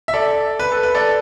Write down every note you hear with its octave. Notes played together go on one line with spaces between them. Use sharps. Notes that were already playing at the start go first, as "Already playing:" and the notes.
E5
A4 D5
B4
A4
B4
A4 D5